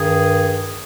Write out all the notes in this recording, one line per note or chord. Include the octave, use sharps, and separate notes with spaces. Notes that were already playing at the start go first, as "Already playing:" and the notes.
Already playing: G2 D#3 G#4